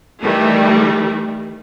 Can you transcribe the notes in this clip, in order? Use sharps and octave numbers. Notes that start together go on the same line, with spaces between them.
D#3 E3 G3 A3